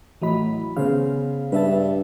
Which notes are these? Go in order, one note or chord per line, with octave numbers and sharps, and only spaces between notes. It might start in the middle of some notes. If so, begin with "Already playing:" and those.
A2 E3 F#3 D#5 B5
C#3 B3 C5 F5
G2 B4 E5 A5